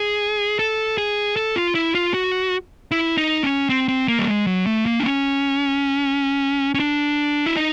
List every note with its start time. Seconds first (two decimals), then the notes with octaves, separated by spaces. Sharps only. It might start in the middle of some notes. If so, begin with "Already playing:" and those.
Already playing: G#4
0.59 A4
0.98 G#4
1.36 A4
1.56 F4
1.75 E4
1.95 F4
2.14 F#4
2.91 E4
3.18 D#4
3.43 C#4
3.69 C4
3.88 C4
4.08 A#3
4.19 G3
4.27 G#3
4.47 F#3
4.66 A3
4.86 A#3
5.00 D4
5.05 C#4
6.74 C#4
6.80 D4
7.46 E4
7.57 D#4